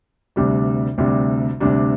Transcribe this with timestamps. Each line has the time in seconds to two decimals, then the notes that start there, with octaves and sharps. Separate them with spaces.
0.36 D2 C3 G3 D4
0.98 D2 C3 G3 D4
1.60 D2 C3 G3 D4